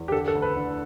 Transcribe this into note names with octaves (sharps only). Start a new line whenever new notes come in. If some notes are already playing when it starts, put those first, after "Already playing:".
Already playing: E2
G4
D3 A4
A4
D2
B4
D3